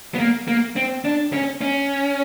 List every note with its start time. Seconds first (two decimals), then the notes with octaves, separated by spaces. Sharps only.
0.15 B3
0.19 A#3
0.48 A#3
0.76 C4
1.05 D4
1.33 C#4
1.61 C#4